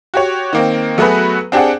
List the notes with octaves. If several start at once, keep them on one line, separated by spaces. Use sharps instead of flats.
F#4 G4 C#5
D#3 A#3 C4
F#3 A3 B3 F#4 G#4 B4
C4 D4 G4 G#4 F#5